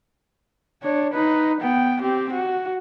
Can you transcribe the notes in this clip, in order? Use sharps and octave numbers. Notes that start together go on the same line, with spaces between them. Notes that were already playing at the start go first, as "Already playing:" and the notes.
D4 C#5
D#4 B4
B3 G5
C4 G4
F#4